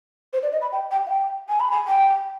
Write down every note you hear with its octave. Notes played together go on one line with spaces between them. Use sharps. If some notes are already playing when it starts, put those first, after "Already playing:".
C5
D5
D#5
B5
G5
G5
F5
G5
G#5
B5
G#5
G5